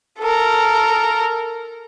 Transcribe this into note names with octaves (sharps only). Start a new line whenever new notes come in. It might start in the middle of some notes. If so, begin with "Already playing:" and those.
A4 A#4